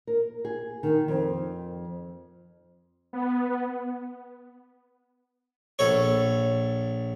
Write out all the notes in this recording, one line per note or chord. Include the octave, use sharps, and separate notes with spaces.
A#4
G#4
D#3
F2
B3
A#1 A4 C#5